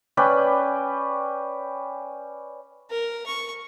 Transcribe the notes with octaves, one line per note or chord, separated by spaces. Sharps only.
C#4 B4 D5 G5
A#4
C#6